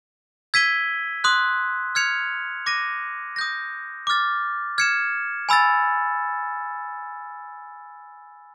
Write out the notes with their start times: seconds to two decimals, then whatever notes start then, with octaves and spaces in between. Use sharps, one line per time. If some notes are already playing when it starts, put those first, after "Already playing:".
0.54 E6 G#6 B6 D#7 G7
1.24 C6 D#6 F#6
1.95 F6 G#6 C#7 F7
2.66 D6 F#6 A#6 D#7
3.36 D#6 G6 A#6
4.07 D6 F6 A6
4.78 F6 G#6 C#7 E7
5.49 G#5 B5 E6 A6